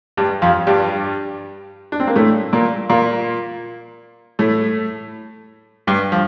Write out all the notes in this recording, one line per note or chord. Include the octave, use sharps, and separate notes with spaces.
G2 G3
F2 F3
G2 G3
D4
C4
A#3
A2 A3
A#2 A#3
A#2 A#3
A2 A3
G2 G3
F3